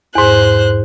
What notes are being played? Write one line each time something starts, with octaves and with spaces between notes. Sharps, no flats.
E2 G#2 C5 F#6